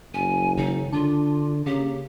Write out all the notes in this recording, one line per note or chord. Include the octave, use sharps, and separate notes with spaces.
F#1 G#5
G#1 C#3 D#4
D3 D4 F4
C#3 A#3 C#4 G4